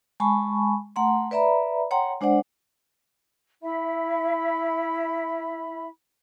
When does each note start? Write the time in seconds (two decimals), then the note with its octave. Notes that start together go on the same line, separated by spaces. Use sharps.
0.20 G#3 G#5 A5 B5 C#6
0.96 A3 F#5 A#5 C6
1.31 B4 D5 E5 A#5 B5
1.91 C#5 F#5 G5 A#5 C6
2.21 G#3 D4 C5 D5 F#5
3.62 E4 E5 B5